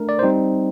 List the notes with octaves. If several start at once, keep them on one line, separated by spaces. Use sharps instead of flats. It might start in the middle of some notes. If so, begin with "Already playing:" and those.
Already playing: A3 D4 A#4
D5
G3 C4 D#4 C5